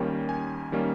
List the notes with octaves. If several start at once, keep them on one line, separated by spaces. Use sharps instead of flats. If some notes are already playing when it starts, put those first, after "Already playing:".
Already playing: D#2 D#3 G3 A#3 C#4 G5
G#5
D#3 G3 A#3 C#4